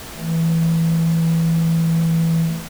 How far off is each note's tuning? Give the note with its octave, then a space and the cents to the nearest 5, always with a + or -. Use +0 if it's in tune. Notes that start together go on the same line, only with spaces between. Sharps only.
E3 +0 A3 +0